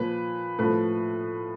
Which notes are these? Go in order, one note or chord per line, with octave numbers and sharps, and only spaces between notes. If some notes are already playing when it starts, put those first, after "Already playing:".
Already playing: A#2 F3 B4
A2 F3 B4